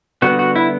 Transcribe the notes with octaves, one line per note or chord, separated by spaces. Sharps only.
D3 G3 B3 F#4
F#4
E4